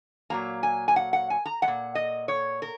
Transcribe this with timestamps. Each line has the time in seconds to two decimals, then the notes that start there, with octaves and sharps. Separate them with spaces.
0.30 A#2 F#3 A#3 A#5
0.63 G#5
0.88 G#5
0.96 F#5
1.13 F#5
1.30 G#5
1.46 A#5
1.62 G#3 F#5
1.68 A#2
1.95 D#5
2.28 C#5
2.62 A#4